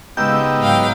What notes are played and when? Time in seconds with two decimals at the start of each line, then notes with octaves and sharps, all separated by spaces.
0.17 C#3 G#3 B3 D#4 G4 E6 G6
0.61 G#2 F#3 F5 G5